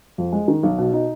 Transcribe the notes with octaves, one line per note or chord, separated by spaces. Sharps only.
F2
G#3
D#3
B1
B2
D#4